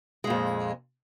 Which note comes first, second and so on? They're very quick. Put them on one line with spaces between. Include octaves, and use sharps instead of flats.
G#3 A#2 F2